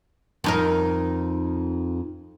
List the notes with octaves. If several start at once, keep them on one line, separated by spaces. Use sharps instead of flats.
F2 D#4 A#4